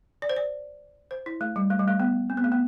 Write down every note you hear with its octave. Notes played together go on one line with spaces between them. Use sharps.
D5
C5
D5
C5
E4
A3
G3
A3
G3
A3
B3
C4
B3
A3
B3